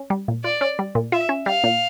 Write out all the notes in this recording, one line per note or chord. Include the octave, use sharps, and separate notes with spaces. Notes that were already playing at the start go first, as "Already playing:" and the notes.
Already playing: C#4
G3
A#2
F4 D5
C#4
G3
A#2
F4 E5
C#4
G3 F5
A#2